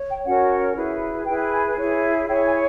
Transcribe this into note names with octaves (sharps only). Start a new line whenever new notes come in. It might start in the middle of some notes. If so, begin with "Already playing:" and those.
Already playing: C#5
G5
C#4 F#4 A#4 C#5 F#5
E4 G#4 B4
E4 G#4 B4 G5
G#5
E4 G#4 C#5
E4 G#4 C#5 G5
G#5